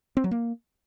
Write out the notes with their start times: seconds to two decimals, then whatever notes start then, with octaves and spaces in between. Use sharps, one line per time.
0.17 C4
0.24 F#3
0.31 A#3